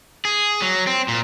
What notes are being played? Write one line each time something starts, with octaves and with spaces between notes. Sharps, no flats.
G#4
F#3
C4
A#2